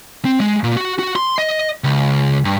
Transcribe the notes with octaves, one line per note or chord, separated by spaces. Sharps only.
C4
G#3
A#2
F#4
F#4
C6
D#5
C#2
G2